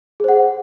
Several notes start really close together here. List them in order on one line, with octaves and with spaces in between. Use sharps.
G#4 C5 F#5